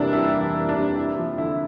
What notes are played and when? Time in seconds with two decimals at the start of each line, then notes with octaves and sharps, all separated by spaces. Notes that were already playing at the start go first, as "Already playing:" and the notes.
Already playing: C3 E3 G3 A#3 D4 E4
0.13 G3 E4
0.34 E3
0.41 E4
0.55 A#3
0.69 D4
0.75 C3
0.95 A#3 E4
1.17 F3
1.38 D3 E4